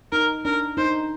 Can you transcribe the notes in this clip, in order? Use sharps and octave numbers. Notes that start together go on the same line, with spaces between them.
D#4 A#4
D4 A#4
D#4 C5